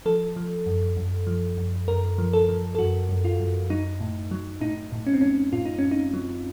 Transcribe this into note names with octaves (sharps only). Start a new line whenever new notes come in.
F3 A4
F3
F#2
F#2
F3
F#2
F#2 A#4
F3
A4
F3
A4
F#2 F#4
F#2
F4
F#2
F#3 D#4
A2
F#3
A2 D#4
A2
C#4
C4
A2 C#4
A2 F4
D#4
A2 C#4
D#4
F#3